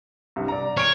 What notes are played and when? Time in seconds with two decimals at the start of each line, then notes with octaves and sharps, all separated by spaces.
0.36 C2 G2
0.48 D5 A#5
0.77 C#5 F6 D7